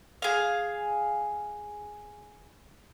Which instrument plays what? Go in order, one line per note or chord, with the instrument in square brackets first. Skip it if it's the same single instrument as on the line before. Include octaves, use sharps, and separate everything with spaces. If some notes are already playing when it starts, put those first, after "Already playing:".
[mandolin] G#4 F5